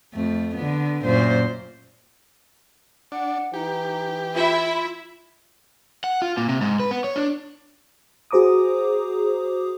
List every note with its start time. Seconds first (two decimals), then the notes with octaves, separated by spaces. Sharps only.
0.14 F2 A3
0.56 D3 B3
1.04 F#2 A#2 C5
3.12 D4 F#5
3.54 E3 D#4 G4
4.34 E4 F4 E5
6.04 F#5
6.22 F4
6.37 A#2
6.49 C3
6.61 G#2
6.79 B4
6.91 B3
7.04 C#5
7.16 D4
8.31 F#4 G#4 C5 A#5 D6 D#6